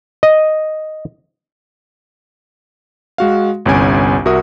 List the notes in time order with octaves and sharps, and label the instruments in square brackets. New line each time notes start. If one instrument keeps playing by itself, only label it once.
[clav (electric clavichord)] D#5
[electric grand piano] G#3 F#4 F5
G1 C2 C#4 G#5 D7
C2 F#4 A#4 E5 D#6